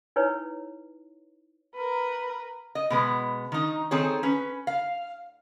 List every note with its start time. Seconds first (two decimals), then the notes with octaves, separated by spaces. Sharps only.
0.16 D#4 E4 B4 C#5
1.74 A#4 B4
2.75 D#5
2.90 B2 G#3 B3
3.52 D#3 D#4
3.91 D#3 C4 G#4 A4 C#5
4.23 C#4 B4
4.67 F5